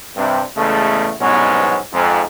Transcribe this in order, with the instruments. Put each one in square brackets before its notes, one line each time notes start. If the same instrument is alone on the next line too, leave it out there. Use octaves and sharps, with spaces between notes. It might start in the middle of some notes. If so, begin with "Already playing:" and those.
[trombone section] G2 C3
E2 C#3 G#3 A3
C2 G#2 B2 F#3 B3 C#4
F2 G#2